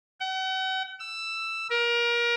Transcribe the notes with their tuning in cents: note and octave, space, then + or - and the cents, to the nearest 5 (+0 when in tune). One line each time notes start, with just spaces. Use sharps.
F#5 +40
E6 +10
A#4 +25